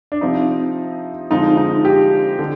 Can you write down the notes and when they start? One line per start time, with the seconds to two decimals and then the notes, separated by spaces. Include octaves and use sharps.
0.12 D4
0.21 C3 F3 C4 D#4
1.30 D3 F3 G#3 C4 D#4
1.57 D#4
1.85 G4
2.39 D3